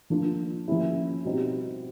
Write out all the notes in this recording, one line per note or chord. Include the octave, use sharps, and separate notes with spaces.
F3 A#3 D4 F4
F3 A#3 C#4 E4
B2 G3 C4 D#4